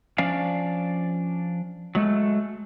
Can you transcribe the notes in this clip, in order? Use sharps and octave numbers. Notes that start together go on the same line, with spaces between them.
F3 C#4 D4 D5 F5
F#3 G#3 A3